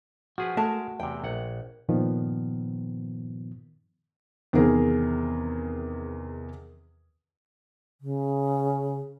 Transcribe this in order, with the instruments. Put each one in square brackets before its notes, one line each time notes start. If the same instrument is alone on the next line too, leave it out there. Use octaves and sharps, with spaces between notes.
[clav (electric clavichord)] F3 G#4 B4 [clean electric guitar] F#4
[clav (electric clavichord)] G#3 A#4 E5 [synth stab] A3 [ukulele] A5
[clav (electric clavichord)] E2 C3 [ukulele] G5
[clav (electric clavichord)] A#1 F#5
[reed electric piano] G2 A#2 D#3 F3 B3
[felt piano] E2 C3 D#3 G#4 A#4
[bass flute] C#3